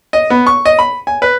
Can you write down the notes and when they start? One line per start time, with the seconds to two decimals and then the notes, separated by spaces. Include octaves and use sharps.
0.13 D#5
0.30 B3
0.47 C#6
0.65 D#5
0.79 B5
1.07 G#5
1.22 B4